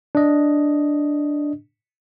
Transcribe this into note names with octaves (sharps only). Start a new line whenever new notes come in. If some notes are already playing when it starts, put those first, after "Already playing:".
D4 D#5